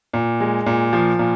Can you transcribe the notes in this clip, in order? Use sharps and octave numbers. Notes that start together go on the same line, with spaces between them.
A#2
G#3
A#2
F3
A#2